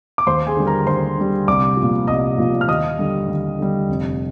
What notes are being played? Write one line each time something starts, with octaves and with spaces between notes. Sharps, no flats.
D6
D#2 C5 C6
G#4 G#5
D3 G3
A#4 A#5
D#2 C5 C6
D3 G3
C2 D5 D6
F3
A#2
C2 D#5 D#6
A#2 F3
F6
D#2 D#5 D#6
D3 G3
D#2
D3 G3
F1